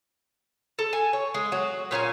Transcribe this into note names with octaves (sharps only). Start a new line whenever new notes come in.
A4
G#5
C#5
G#3
F#3 F#4
A#2 C#4 F5 G#5